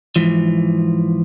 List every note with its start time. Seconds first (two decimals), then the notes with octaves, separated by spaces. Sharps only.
0.16 G#2 E3 F3